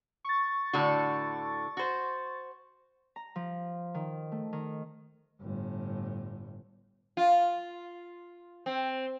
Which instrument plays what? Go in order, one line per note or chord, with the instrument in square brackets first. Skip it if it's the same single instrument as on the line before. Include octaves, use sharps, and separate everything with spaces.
[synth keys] C#6 A6
[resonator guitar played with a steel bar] A2 D3 F#4
F#4 C5
[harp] A#5
F3
D#3
A3
D#3
[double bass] G1 A2
[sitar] F4
C4